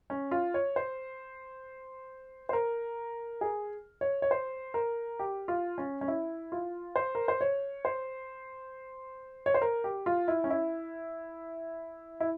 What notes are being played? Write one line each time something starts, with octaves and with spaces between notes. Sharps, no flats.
C#4
F4
C#5
C5
C5
A#4
G#4
C#5
C#5
C5
A#4
G4
F4
C#4
C#4
E4
F4
C5
A#4
C5
C#5
C5
C#5
C5
A#4
G4
F4
E4
C#4
E4
E4